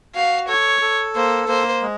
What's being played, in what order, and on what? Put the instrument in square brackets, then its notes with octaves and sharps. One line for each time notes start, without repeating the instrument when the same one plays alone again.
[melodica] F#4 [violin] F5
[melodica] A4 [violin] C#5
[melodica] A4
[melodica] A#3 [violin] C5
[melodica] A#3 [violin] C5
[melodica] G#3